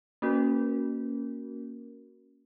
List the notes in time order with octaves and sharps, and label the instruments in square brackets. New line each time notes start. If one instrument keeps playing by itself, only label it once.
[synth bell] A#3 C#4 F#4 A#4